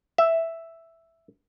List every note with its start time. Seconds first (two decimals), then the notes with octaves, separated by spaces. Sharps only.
0.18 E5